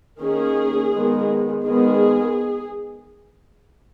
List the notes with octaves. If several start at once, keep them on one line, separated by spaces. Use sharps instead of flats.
D#3 A#3 C#4 G#4
D#3 G#3 B3
D#3 G#3 B3 G#4